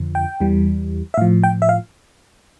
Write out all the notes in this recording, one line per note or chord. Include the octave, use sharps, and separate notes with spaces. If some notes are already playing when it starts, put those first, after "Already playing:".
Already playing: F2 D3 F3
G5
E2 E3 G3
E5
A2 F3 F5
G5
E5
F5